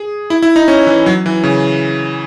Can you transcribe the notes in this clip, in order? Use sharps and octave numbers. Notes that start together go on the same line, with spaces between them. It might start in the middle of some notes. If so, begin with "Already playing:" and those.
Already playing: G#4
E4
E4
D#4
C#4
E3
F#3
E3
C#3